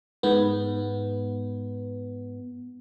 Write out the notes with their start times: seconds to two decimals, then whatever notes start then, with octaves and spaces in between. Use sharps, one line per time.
0.23 G#2 B3